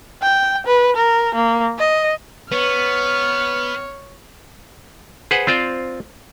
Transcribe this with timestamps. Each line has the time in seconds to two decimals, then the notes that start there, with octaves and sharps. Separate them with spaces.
0.22 G5
0.67 B4
0.96 A#4
1.35 A#3
1.79 D#5
2.52 B3 B4 C#5 F6
5.31 G#4 B4 C5 F#5
5.47 C4 F4 C5 D5